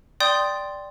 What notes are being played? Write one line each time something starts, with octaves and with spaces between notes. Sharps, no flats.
D5 G5 C6 D#6 G6